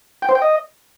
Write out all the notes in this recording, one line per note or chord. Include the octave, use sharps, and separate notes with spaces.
G5
C5
G5
D#5